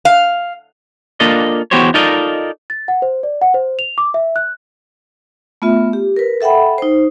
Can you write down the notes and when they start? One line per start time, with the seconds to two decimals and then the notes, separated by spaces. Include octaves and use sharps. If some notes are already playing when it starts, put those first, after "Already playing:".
0.05 F5
1.20 A#3 D4 F4 A4 D#5
1.71 E2 B3 F#4 G4 C5 C#5
1.94 D#4 F4 A4 A#4 D5 D#5
2.70 A6
2.88 F#5
3.02 C5
3.23 D5
3.42 F#5
3.54 C5
3.79 F7
3.98 D6
4.14 E5
4.36 F#6
5.62 A3 B3 F4 E5
5.93 G4
6.16 A#4 B4
6.41 A4 E5 F#5 G5 B5
6.78 D#4 C5